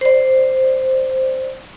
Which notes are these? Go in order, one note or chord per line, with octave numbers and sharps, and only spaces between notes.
C5 D5